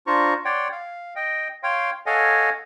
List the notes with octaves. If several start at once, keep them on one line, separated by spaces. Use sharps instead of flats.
D4 F4 C5 A#5 C#6
C#5 D5 F#5 G5 C6
F5
D#5 G5
C#5 F5 G5 C6
A4 C#5 D#5 F5 F#5 G#5